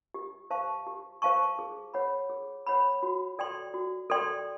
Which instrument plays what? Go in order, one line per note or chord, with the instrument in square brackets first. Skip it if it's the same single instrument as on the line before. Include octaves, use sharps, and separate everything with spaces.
[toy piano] G4
C5 F5 A5 C#6
G4
C5 F5 A5 C#6
G#4
C#5 F#5 B5
G#4
C#5 F#5 B5
F#4
A4 D5 G5 C6
F#4
A4 D5 G5 C6